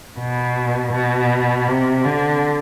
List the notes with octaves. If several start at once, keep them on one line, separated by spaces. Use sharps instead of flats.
B2
B2
C3
D3